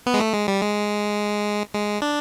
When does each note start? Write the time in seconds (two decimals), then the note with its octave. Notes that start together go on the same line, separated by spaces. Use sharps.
0.06 B3
0.14 G#3
0.20 A3
0.34 G#3
0.48 G3
0.62 G#3
1.74 G#3
2.02 D4